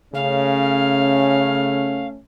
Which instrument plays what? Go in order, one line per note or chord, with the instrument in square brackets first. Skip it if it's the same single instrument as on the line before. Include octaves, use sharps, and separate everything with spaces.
[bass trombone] C#3 [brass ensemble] A3 C#4 [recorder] F5